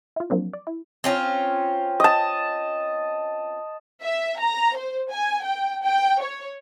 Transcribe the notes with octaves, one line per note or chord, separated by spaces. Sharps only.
E4 F4
F3 F#3 A#3 C4 D4
D5
E4
C4 C#4 F4
D#5 A5
E5
A#5
C5
G#5
G5
G5
C#5